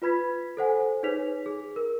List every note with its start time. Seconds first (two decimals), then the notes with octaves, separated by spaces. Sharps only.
0.02 F4 B4 B5 G#6 B6
0.57 A4 C5 F#5 G#5
1.03 D#4 G#4 B4 C#5 B6 F7
1.46 G#4
1.76 A#4